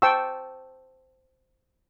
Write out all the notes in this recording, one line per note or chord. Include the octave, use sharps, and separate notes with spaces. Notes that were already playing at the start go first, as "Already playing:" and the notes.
C5 G5 A5 C#6 E6